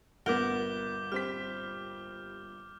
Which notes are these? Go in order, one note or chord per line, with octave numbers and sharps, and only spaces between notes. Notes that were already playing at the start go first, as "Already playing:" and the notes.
G1 A#2 B3 A#4 F#5 D6 G6 G7
G3 C4 F6 B6